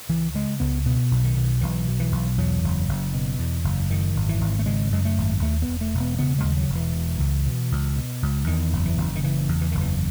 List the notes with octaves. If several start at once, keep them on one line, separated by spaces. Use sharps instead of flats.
C#2 E3
C#3 G#3
C#2 B3
B2 B3
B1
D#3
B2
B1 E3
B2
E3
B1
E2 F#3
F#1
F#1
B2
E2
F#1
F#2 D#3
G#1
E3
G#1
A3
C#3 G#3
F#2 G#3
A3
G#1
D#2 A3
B3
E1
A3
E1
B3
C#3 B3
G#3
D#2
F#3
E1
E3
B2
C#2
B2
C#2
B2
C#2
E2 D#3
F#1
E3
F#1
D#3
C#3 E3
E2
E3
F#1 D#3
E3